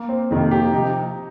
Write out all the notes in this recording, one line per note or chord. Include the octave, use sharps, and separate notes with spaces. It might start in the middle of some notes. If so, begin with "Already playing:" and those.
Already playing: A#3
C4
F2 C3 D#3 A#3 D#4
G4
C3 F3 D#4